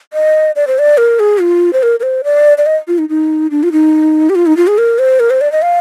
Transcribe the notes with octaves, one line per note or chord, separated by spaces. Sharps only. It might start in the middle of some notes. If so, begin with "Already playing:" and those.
D#5
D5
C5
D5
A#4
G#4
F4
C5
A#4
A#4
C5
D5
D5
D#5
F4
D#4
D#4
D4
F4
D#4
G4
F4
D#4
F4
G#4
A#4
C5
A#4
C5
D5
D#5
F5